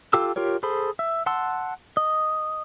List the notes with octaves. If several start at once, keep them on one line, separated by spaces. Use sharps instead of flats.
F4 G4 A4 D6 E6
F4 G4 A#4 C#5
G#4 A4 C5 B5
E5
F#5 A5 C6 E6
D#5